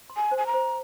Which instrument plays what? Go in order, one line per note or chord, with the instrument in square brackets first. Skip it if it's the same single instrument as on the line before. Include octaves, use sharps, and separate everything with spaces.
[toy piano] C6
[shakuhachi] G#5
[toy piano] C5
[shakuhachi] G#5
A#5
[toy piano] C5